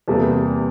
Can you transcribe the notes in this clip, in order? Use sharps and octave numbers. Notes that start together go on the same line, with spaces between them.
E2 C3 G3 A#3 A4